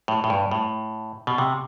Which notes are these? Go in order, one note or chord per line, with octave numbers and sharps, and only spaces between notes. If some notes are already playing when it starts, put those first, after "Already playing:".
A2
A2
G2
A2
B2
C3